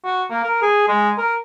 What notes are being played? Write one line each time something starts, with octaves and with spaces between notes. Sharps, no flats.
F#4
A#3
A#4
G#4
G#3
A#4